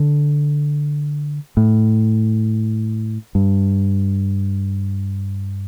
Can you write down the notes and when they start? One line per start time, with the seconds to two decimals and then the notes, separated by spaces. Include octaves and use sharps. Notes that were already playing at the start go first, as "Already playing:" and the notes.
Already playing: D3
1.57 A2
3.35 G2